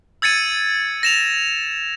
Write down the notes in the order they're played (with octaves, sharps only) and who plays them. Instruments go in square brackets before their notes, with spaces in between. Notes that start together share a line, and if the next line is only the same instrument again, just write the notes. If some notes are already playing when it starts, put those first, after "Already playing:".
[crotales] E6 G#6 A6 C#7 D#7
A#6 E7 F7